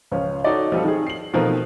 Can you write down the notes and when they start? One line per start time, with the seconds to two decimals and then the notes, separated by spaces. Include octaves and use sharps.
0.12 C#2 F3 C#4
0.44 D#4 F#4 A4 C#5 D5
0.72 F3 G3 C4 A4
0.85 D#3 G#4
1.07 C7 F#7
1.34 B2 D#3 F3 A3 C4 A#4